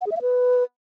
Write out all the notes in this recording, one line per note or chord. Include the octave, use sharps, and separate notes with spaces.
F#5
G#4
E5
F5
B4